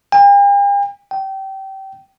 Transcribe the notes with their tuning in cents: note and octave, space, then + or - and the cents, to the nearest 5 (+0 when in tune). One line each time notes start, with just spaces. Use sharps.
G5 +45
G5 -25